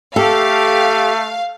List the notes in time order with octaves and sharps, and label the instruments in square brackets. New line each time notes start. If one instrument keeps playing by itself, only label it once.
[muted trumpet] A3 [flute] G4 [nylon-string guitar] A4 [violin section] F5